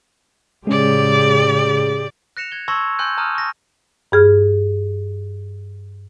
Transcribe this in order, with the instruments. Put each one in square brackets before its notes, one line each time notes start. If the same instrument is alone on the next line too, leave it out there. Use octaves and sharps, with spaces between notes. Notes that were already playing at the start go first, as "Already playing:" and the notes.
[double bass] A2 C#3 [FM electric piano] G#3 C#4 [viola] G4 D5 [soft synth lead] G#4
[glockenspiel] F#6 A#6 C#7 E7 F7
G#6 G7
A5 C6 C#6 E6 G#6 A#6
G#5 C6 E6 F#6 G6 D#7
A5 A#5 D#6 F6 F#6 D#7
C#6 A#6
[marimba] G2 G#4 F6